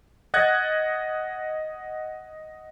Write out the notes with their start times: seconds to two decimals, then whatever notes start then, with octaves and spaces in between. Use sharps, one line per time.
0.34 D#5 F#5 F#6 G#6 A6